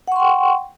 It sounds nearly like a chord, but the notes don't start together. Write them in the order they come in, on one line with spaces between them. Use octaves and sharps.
F#5 C#6 C6 G5